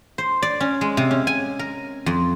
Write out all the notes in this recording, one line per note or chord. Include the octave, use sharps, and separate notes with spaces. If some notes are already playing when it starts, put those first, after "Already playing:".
C5
D5
C#4
G#3
C3
C#4
G#5
A#4
F2